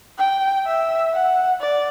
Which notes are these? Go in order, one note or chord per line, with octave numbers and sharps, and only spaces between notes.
G5
E5
F#5
D5